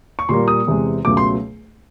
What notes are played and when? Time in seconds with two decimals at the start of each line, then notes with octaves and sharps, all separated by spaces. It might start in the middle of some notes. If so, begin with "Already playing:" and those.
0.19 C#6
0.29 A#2 G3 A#3 C6
0.48 D#6
0.67 E2 C3 E3 G#3
1.05 C#2 B2 F#3 A3 D6
1.17 C6